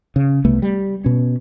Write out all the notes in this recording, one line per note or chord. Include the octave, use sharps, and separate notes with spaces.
C#3
C2 A3 B3
G3
B2 C#4